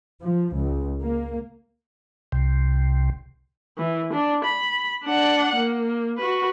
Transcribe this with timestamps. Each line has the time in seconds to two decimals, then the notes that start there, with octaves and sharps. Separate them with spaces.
0.22 F3
0.55 C#2
1.01 A#3
2.32 C2 C3
3.78 E3
4.13 D4
4.44 B5
5.05 D4 F#5
5.56 A#3
6.18 F#4 B4